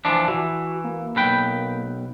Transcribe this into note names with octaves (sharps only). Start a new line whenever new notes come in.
E3 F3 D4
E3 F#4
A#3
B1 B4 G5